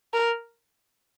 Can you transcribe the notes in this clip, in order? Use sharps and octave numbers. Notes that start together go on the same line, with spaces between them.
A#4